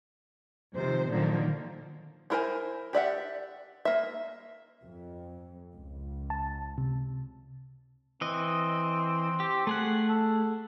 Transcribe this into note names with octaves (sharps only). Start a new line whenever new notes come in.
C3 D#3 F3 C5
A#2 D3 D#3 F3 F#3 A#3
D4 E4 A#4 C5 G#5
G4 D5 E5 F#5
A#3 E5
F2
C#2
A5
C3
E3 C4 D#5
G4
A3 G#4 F#5
A4